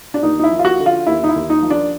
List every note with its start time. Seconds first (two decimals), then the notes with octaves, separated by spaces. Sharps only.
0.14 D4
0.23 D#2 D#4
0.39 D#4
0.44 E4
0.51 F3
0.59 F4
0.65 F#4
0.79 D3
0.86 F4
1.07 D#2 E4
1.24 D#4
1.29 E4
1.36 D#2
1.50 D#4
1.63 F3
1.70 D4